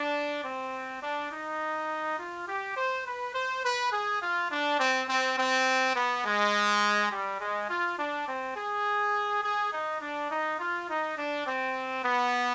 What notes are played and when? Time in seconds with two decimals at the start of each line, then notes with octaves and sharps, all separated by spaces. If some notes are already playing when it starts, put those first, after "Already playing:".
Already playing: D4
0.45 C4
1.03 D4
1.32 D#4
2.19 F4
2.48 G4
2.77 C5
3.06 B4
3.35 C5
3.64 B4
3.92 G#4
4.22 F4
4.51 D4
4.80 C4
5.09 C4
5.38 C4
5.96 B3
6.25 G#3
7.12 G3
7.41 G#3
7.70 F4
7.99 D4
8.28 C4
8.57 G#4
9.44 G#4
9.73 D#4
10.02 D4
10.31 D#4
10.59 F4
10.89 D#4
11.18 D4
11.47 C4
12.05 B3